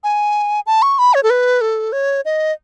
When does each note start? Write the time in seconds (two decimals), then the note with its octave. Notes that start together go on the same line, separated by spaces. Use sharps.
0.04 G#5
0.66 A5
0.82 C#6
0.99 B5
1.14 C#5
1.23 A4
1.30 B4
1.61 A4
1.93 C#5
2.25 D#5